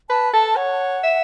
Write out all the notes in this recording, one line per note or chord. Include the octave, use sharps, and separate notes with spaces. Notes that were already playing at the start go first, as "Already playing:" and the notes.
B4 A5
A4 A5
C#5 F#5
E5